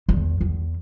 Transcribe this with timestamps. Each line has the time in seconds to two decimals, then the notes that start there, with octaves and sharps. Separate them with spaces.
0.09 E2
0.41 E2